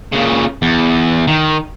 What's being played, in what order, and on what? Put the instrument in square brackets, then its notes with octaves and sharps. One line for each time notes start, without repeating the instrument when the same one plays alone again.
[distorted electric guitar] A#2 C#3
E2
D#3